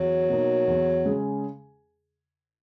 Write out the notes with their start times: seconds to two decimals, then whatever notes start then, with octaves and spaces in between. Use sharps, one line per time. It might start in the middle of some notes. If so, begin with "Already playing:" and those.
Already playing: E2 F#3
0.30 B2 A#3 D#4
0.68 E2
1.05 C#3 G#3 C#4 G#4